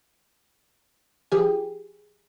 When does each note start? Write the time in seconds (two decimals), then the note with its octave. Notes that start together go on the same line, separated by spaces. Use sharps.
1.32 F3 G4 G#4